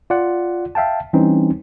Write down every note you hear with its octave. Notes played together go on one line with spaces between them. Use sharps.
F4 D5 F#5
E5 F5 G5 A5
E3 G3 C4 C#4 D#4